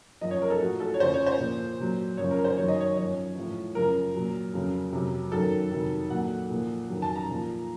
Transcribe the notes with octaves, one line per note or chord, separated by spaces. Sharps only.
F#2 F3 D#5
C#5
A#4
A4
A2 F3 F#4
A4
C#5
F2 C#3 F3 C5
C#5
C5
A#2 F3
A#2 F#3
F#2 C#3 F3 C#5
A#4
C5
F#2 D#3 F#3 C#5
D#5
C#5
F#2 F3 C#5
A2 F3
F#2 C#3 F3 A#4
A#2 F#3
F2 C#3 F#3
F2 C3 F#3
F#2 D#3 F#3 A4
F2 C3 D#3 F#3
A#2 F#3 F#5
A#2 F3
F2 D#3 F#3
A5
A#5
A#2 F3